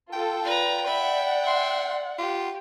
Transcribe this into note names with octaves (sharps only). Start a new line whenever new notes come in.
F4 A4 G5
F4 B4 D5 A#5
E5 F#5 B5
E5 C6
F4 G4